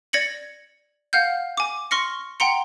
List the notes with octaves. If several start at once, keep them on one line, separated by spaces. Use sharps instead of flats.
D5 G#6 A#6 C#7 F#7
F5 F#5 F6 G6
G#5 D6
C6 C#6 F6 A#6 C#7
F#5 G5 A#5 C6 C#7